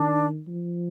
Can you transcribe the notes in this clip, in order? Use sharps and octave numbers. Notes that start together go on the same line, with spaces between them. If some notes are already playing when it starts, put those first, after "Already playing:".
Already playing: D#3 D4
F3